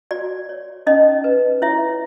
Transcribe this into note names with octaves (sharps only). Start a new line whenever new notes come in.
F#4 D5
C#5
C#4 D#4 D#5
B4
E4 C#5 E5